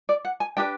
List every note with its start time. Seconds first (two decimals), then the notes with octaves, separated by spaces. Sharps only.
0.09 D5
0.25 F#5
0.40 G#5
0.57 D4 G4 B4 G5